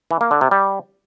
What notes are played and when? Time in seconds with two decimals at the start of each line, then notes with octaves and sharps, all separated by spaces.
0.11 E3
0.21 A#3
0.31 D3
0.41 C3
0.51 G3